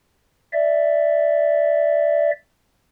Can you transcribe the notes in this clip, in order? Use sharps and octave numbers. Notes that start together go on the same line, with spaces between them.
D5 E5